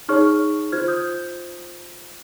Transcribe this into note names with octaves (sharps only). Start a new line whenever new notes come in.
D#4 G#4 C#5 C#6 F6
F4 C5 F6 G#6
D#6 G6